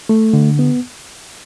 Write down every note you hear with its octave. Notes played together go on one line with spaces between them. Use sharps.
A3
D3
B3